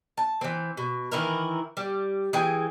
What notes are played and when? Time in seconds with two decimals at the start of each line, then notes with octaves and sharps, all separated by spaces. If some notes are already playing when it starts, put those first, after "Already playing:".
0.17 A5
0.41 E3 C4
0.77 B2
1.11 D#3 E3 E4 A#4
1.77 G3
2.33 E3 G#4 G5